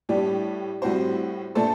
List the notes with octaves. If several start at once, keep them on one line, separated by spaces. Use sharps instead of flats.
A2 G3 D4 G4
A2 G3 C4 F#4 C5
A#2 A3 D4 A4 C5